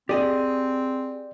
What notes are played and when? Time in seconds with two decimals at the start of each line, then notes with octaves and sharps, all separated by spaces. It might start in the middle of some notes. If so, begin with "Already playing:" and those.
0.09 C4 G4 G#4 D5 D#5